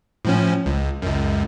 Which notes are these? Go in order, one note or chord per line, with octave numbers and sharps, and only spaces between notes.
A2 F3 C#4
C#2
C#2 F#2